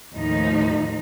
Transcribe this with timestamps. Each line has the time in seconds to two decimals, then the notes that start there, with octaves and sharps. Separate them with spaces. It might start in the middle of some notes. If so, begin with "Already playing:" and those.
0.13 D#2 A2 F3 D#4